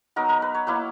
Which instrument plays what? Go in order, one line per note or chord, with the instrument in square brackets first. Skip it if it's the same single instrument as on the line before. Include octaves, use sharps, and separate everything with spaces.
[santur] F#3 B3 D#4 A#4
A#4
B4
C#5
F#3 A#3 E4 B4